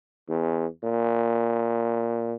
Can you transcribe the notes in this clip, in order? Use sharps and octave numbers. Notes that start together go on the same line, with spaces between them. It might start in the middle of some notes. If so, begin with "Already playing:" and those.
E2
A#2